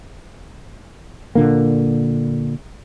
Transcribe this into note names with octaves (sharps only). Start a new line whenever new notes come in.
A#2 D3 A#3